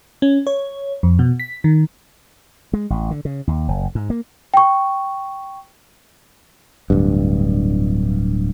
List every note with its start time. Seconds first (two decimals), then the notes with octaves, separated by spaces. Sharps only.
0.22 C#4
0.47 C#5
1.03 F2
1.19 B2
1.40 B6
1.64 D#3
2.73 G#3
2.90 A1
3.11 D3
3.25 C#3
3.47 D#2
3.68 F#1
3.95 G#2
4.10 A#3
4.54 G5 C#6
6.90 D1 G2